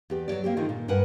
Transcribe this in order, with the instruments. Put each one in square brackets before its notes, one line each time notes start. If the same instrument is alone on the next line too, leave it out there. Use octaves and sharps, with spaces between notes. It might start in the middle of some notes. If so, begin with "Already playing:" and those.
[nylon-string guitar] E2 G4 D5
F#3 C#5 D5
A#3 C4 G4
D3 D#3 G#3 F4 A#4
A#2
G2 A#4 B4 F#5 G#5